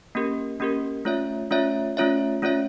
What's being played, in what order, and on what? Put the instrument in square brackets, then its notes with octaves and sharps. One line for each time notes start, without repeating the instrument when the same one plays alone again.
[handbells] A#3 C#4 G4 A#4
A#3 C#4 G4 A#4
A3 C#4 F4 C#5 E5
A3 C#4 F4 C#5 E5
A3 C#4 F4 C#5 E5
A3 C#4 F4 C#5 E5